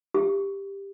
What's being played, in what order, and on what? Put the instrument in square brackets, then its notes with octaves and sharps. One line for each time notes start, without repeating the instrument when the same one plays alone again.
[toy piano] G4